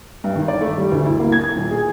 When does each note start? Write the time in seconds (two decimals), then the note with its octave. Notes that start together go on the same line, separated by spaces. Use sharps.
0.24 G2
0.36 D#3
0.48 D5
0.61 A3
0.78 G3
0.92 D2
1.05 E4
1.20 A#3
1.32 G#6
1.44 G#6
1.56 D#1
1.71 G#4